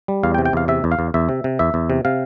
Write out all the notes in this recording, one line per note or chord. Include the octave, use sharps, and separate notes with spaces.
G3
E2 F5
G5
C3
G5
E2 F5
C3 E5
E2
F5
E2
E2 E5
C3
C3
E2 E5
E2
C3
C3 F5